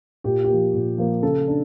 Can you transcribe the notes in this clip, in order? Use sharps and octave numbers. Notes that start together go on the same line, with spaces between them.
A#2 G4
G4
F3 A#3
A#2
F3 A#3
C#3 A4
D4